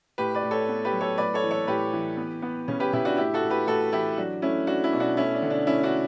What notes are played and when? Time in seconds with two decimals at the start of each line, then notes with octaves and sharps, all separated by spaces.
0.18 A2 G4 B4
0.35 B4 D5
0.43 A2
0.51 A4 C#5
0.69 B3
0.85 G4 B4
0.92 F#3
1.01 A4 C#5
1.18 A2 B4 D5
1.34 A4 C#5
1.44 E3
1.51 A4 C#5
1.67 A2 G4 B4
1.93 E3
2.17 B3
2.42 B3
2.68 C#3 C#4
2.80 G4 B4
2.93 C#3 E4 G4
3.05 D4 F#4
3.17 A2 E4 G4
3.34 F#4 A4
3.43 A2
3.50 G4 B4
3.67 A2 F#4 A4
3.93 E3 E4 G4
4.18 F#3 D4 F#4
4.42 A3 C#4 E4
4.67 A3 D4 F#4
4.84 C#4 E4
4.93 B2
5.00 D4 F#4
5.17 A3 C#4 E4
5.34 D4
5.42 D3
5.50 D4
5.67 A3 C#4 E4
5.83 D4 F#4